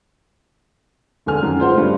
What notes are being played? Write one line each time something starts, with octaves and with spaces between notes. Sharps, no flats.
E1 D3 A4 G#5 F6
F#2 D#3 F#3
G#3 F4 C5 F#5
G2 C#3 A3